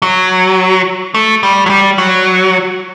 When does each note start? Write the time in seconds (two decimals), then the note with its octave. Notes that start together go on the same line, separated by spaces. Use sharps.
0.03 F#3
1.14 A3
1.43 G3
1.66 F#3
1.70 G3
1.98 F#3